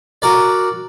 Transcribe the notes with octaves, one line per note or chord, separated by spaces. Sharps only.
F#4 A#4 D5